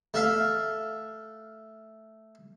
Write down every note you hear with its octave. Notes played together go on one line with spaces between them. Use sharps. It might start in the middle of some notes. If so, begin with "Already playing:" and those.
A3 E5 F5